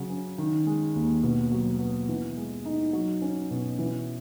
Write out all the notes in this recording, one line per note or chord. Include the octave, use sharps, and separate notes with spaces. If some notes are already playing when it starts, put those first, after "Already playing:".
Already playing: C#3 F#3
C#4
D#3
G#3
D#2
B2
F#3
B3
E3
G#3
D#4
F#3
C#4
B2
E3